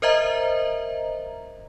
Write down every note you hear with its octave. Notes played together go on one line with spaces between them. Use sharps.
A#4 C5 D#5 E5 A#5